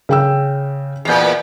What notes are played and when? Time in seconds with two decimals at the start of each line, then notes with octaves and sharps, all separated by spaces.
0.09 C#3 G5 E6
1.05 E2 A#2 B3 G6 C7